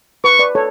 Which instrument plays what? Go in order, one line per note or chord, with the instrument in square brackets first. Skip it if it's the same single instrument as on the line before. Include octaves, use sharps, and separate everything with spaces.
[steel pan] B4 [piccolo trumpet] C#6
[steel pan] B4 D5
A4 C#5